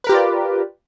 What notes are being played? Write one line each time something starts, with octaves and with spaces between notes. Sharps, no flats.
F4 G4 A#4 B4 D5